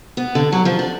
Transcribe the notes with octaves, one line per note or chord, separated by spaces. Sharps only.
B3
D3
F#3
F3
D4